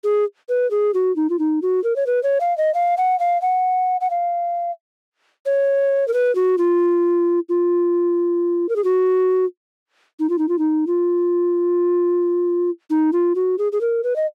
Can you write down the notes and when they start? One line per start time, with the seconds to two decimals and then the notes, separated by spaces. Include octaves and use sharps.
0.04 G#4
0.49 B4
0.71 G#4
0.94 F#4
1.16 D#4
1.30 F4
1.39 D#4
1.62 F#4
1.84 A#4
1.96 C#5
2.06 B4
2.23 C#5
2.40 F5
2.57 D#5
2.74 F5
2.97 F#5
3.19 F5
3.42 F#5
4.01 F#5
4.10 F5
5.46 C#5
6.08 A#4
6.13 B4
6.35 F#4
6.58 F4
7.49 F4
8.69 A#4
8.76 G#4
8.84 F#4
10.19 D#4
10.29 F4
10.38 D#4
10.48 F4
10.58 D#4
10.87 F4
12.90 D#4
13.13 F4
13.35 F#4
13.58 G#4
13.72 G#4
13.81 A#4
14.03 B4
14.16 D#5